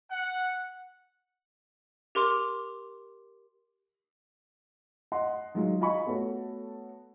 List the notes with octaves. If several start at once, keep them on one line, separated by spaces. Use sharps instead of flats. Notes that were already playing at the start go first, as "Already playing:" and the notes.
F#5
G4 A#4 C6 D6
D#5 F#5 C6
D#3 F#3 G#3 D#4 F4
F4 D#5 G#5 B5 C#6
A3 B3 F#4 A4 C#5